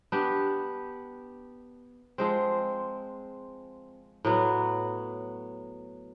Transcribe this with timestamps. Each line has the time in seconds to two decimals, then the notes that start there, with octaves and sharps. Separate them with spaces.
0.12 B3 D4 G4
2.18 F3 G#3 C4
4.25 A2 F#3 B3